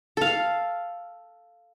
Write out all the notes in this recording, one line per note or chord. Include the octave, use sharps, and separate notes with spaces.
A4 F5